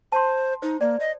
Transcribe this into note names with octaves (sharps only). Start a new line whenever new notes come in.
C5 A5 C6
D#4 C5
A#3 D5
D#5